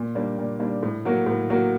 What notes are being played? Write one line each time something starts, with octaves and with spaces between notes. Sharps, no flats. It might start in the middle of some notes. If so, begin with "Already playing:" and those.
Already playing: A#2
G3 A#3 D4
A#2
G3 A#3 D4
A2
F#3 A#3 F#4 A#4
A2
F#3 A#3 F#4 A#4